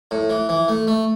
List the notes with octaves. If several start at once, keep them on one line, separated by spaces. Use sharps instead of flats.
A2
E3
E3
A3
A3